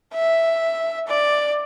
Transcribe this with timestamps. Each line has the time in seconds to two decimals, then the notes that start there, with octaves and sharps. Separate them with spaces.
0.14 E5
1.08 D5